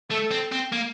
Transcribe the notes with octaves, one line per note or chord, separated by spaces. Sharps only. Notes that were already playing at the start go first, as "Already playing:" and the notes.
A3 A4
C4
C4
A#3